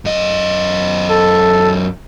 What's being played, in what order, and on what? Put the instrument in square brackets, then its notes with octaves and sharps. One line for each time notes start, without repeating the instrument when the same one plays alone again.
[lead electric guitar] F#2 D#5
[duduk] A4